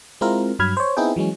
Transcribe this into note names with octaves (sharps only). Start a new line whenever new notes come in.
G#3 C4 E4 F4 A#4
G2 F#3 B5 F6 G#6
C5 C#5
B3 C4 D#4 E4 G#4 G5
E3 F#3 G#3 C#4